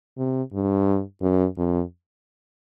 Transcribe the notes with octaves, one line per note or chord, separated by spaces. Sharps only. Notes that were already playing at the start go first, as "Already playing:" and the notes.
C3
G2
F#2
F2